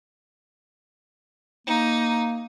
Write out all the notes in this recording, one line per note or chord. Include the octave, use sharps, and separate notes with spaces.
A#3 D#4